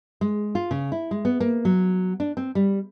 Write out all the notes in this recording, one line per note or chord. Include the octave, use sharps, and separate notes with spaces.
G#3
F4
C#3
E4
G#3
B3
A#3
F#3
D4
C4
G3